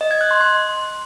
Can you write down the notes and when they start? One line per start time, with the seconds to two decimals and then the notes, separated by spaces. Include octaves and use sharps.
0.01 D#5
0.11 G#6
0.21 F#6
0.31 C6
0.41 C6